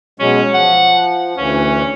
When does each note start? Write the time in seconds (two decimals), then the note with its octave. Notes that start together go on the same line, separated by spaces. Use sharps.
0.20 B2 F#3 G#3 C#4
0.54 F3 F#5
1.37 D2 E3 C#4